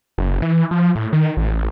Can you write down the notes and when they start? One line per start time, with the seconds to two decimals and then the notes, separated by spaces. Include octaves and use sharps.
0.18 F#1
0.42 E3
0.71 F3
0.95 A2
1.13 D#3
1.37 A1